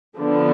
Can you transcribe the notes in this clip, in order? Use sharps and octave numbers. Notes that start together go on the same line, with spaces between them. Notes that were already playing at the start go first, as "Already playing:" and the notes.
D3 F3 B3 D4